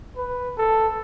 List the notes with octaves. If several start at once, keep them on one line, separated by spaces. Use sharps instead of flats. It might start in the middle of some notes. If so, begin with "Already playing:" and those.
B4
A4